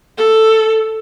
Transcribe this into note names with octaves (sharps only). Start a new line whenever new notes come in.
A4